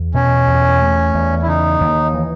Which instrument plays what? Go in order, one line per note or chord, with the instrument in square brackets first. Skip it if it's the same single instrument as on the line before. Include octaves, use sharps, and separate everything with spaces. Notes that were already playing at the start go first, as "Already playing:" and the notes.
Already playing: [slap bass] E2
[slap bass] B2 [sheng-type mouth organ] C#4
[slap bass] E2
A3
E2
[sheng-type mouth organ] E4
[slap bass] C#3 [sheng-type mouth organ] D#4
[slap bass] D#2
E3